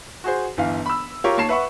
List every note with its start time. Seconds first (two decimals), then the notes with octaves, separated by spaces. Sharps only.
0.24 F#4 G#4 C5
0.57 G1 E3 F5
0.86 B5 E6
1.24 F4 G4 A#4 C#5
1.37 D#2 C#5 A5 C7 E7
1.49 B4 E5 F#5 C#6